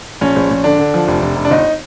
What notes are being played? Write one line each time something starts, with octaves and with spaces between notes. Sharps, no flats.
A#1 C#4
A#1
A#1
D3 D4
D3
F3
F1
F1
F1
D4
G1 D#4